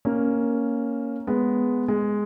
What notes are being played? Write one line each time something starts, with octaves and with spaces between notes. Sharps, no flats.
A#3 C#4
G#3 B3
G#3